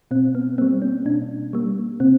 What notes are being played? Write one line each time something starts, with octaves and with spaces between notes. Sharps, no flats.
B2 C4
B3
G3 A#3 C4
C#4
B2 D4
G3 A#3
C3 C4